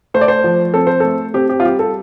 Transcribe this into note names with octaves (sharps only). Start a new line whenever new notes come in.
A3 C5
D5
C5
F3
C4 A4
C5
A3 A4
C4 G4
G4
F4
G3 G4
A4